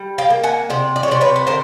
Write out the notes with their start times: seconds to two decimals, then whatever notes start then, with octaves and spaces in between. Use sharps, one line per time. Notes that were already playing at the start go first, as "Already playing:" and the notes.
Already playing: G3
0.18 F5 G5
0.30 A#3
0.43 F#5 G#5
0.70 C3 C5 D5
0.96 D5
1.03 C#5
1.08 C3 C5 D5
1.21 B4 C#5
1.36 B4
1.47 D3 A#4 C5